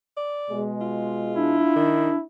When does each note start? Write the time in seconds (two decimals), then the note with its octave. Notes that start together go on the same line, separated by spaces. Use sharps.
0.17 D5
0.50 B2 G#3
0.81 F4
1.36 D4 E4
1.76 D#3